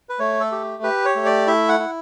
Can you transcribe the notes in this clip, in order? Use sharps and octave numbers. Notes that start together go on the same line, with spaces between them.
B4
A3 C#5
A4
G4
G4 B4
C#5
A3
D5
E4 E5
F#5
E4